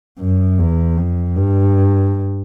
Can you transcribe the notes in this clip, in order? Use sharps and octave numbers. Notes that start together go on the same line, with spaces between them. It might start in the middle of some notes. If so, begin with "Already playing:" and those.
F#2
E2
F2
G2